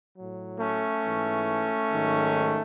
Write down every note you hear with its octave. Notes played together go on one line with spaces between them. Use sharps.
A2 F#3
A3 C#4
G#2 E3
G#2 D#3 F#3